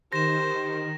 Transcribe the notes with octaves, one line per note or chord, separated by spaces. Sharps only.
D#3 G4 C5 A#6 E7